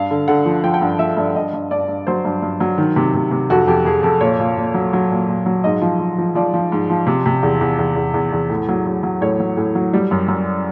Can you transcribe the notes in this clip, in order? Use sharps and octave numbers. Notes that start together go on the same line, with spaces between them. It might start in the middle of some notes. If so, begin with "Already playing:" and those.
Already playing: G2 F5
D3
D3 F#5
F3
F3 G5
G5
G2 F#5
F3 E5
G2 E5
G2 D#5
G2
G2 D5
G2
F#3 C5
G2
G2
F#3
D#3
C3
C3
C3
F2 F#4
F2 G4
F2 G#4
F2 A4
A#2 C#5
A#2
A#2
F#3
F#3
A#2
A#2
F#3
G#2 D#5
F3
F3
F3
F3 D5
F3
G#2
F3
C3
C3
E2
E2
E2
E2
E2
E2
A2
F#3
F#3
F#3
A2 C#5
F#3
A2
F#3
G3
F#2
F#2